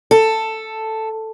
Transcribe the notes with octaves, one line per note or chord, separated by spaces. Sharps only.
A4